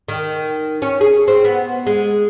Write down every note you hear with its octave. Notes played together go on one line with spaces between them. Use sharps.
D#3
C#4
G#4
C4
B3
G#3